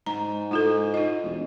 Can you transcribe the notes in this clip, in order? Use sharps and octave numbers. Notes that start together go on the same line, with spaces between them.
G#2 A#5
G#2 E4 F4 A4
D#4 D#5
E1